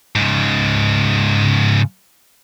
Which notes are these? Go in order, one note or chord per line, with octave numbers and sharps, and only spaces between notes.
G#2 C#3